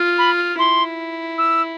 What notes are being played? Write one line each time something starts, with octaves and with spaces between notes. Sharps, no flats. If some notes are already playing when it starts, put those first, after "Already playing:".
Already playing: F4
B5
E4 C6
E6